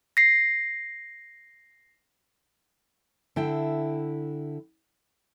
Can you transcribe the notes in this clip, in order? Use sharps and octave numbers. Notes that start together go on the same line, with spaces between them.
A#6 C7
D3 E4 G5